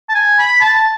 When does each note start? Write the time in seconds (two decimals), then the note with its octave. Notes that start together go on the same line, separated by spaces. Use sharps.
0.09 A5
0.15 G#5
0.39 B5
0.60 A5